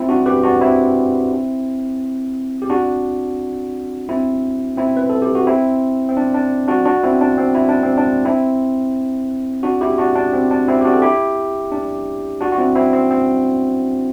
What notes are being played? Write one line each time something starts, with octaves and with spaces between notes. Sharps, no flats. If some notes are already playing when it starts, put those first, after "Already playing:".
Already playing: C4 E4
D4 F#4
G4 B4
D4 F#4
C4 E4
G4
D4 F#4
C4 E4
C4 E4
B4
A4
G4
F#4
C4 E4
C4
D4
D4
D4 F#4
D4 F#4
C4 E4
D4
C4
E4
D4
C4
D4
C4 E4
D4 F#4
E4 G4
D4 F#4
D4
C4
D4
C4 E4
G4
D4 F#4
A4
E4 G4
D4
D4 F#4
F#4
C4 E4
C4 E4
C4
C4